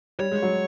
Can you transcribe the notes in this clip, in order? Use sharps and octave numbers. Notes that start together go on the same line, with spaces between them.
G3 C#5
G#3
F#3